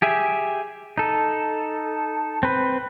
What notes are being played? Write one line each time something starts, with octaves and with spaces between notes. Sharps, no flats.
G4 G#4 E5
D#4 A4
C4 B4